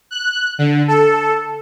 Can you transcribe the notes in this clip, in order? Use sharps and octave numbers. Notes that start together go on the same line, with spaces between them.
F#6
D3
A4